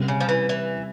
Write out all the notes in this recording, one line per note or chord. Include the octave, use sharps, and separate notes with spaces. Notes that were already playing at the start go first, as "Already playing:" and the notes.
Already playing: C3 G3 C#4
C#3
F3
E3
E3